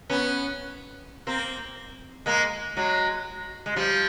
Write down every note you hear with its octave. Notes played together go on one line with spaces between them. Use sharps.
B3 C#4
A#3 C4
G#3 A#3
F#3 G#3
G#3
F3 G3